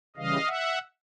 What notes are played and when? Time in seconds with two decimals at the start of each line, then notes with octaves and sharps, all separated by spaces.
0.16 C#3 E3 G3 D#5 F5
0.47 E5 F#5